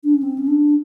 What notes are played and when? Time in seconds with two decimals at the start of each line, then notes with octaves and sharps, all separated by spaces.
0.04 D4
0.14 C#4
0.23 C4
0.38 C#4
0.48 D4